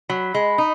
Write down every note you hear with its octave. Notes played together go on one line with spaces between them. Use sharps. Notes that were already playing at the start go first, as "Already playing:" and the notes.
F#3 B5
G#3
D#4